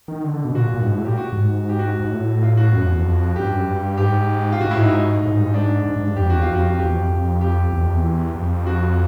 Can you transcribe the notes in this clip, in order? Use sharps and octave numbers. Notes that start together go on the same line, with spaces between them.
D#3
D3
D3
B2
A#2 F#4
A#2
G2
G#2
A2
A#2 G4
F#4
G#2
G4
F#4
G#2
A2
F4
F#4
F#2
F2
E2
F2
G2 G4
F#2
G2
G#2 G4
F4
G#2 F#4
A2 E4
G#2 D#4
A2
G#2
G2
G#2
D4
G#2
G#2
G2
F2 G4
E2 F#4
F4
F2
F#4
E2 G4
F2
F2
G4
E2
F2
E2
F2
F#4